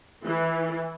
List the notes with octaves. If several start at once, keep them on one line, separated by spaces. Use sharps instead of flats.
E3